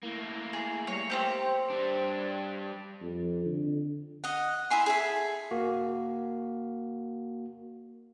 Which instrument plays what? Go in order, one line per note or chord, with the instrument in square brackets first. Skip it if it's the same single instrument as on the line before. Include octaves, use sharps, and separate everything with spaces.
[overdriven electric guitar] A3 A#3 [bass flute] E4
[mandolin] G#4
[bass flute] G3 [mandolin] C#5
[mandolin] C4 E4 G4 [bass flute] C5
[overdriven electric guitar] G3 D4
[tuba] F2
D3
[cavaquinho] D#5 F#5
E4 E5 G#5 C6
G#4 A4 E5
[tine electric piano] A#3 F#4